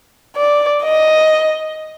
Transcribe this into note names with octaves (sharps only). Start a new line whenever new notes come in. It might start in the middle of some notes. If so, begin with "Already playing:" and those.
D5
D#5